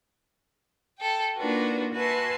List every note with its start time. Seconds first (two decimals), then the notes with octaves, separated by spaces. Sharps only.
0.98 A4 G5
1.36 A#3 D4 D#4 F4 F#4 B4
1.93 F#4 B4 E5 G#5 A5 C6